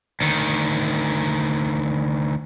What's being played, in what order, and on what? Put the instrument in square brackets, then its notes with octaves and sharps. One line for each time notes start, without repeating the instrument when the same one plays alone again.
[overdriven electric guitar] D2 D#3